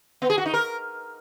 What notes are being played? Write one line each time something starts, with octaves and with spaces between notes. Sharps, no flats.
B3
G#4
F#4
D#4
A#4